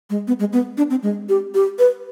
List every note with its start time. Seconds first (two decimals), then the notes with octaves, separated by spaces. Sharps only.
0.10 G#3
0.28 B3
0.40 G#3
0.53 B3
0.77 D4
0.90 C4
1.03 G#3
1.29 G4
1.54 G4
1.79 B4